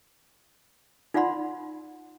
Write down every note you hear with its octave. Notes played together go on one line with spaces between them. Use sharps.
D#4 F4 D5 F#5 B5 C6